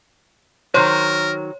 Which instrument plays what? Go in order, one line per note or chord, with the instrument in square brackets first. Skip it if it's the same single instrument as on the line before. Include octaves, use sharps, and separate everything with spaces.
[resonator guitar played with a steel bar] D#3 F#3 [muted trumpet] A#4 [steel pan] C5 [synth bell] C#5